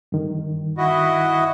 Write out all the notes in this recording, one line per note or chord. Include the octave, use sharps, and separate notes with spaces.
G2 D#3
E4 F#4 D#5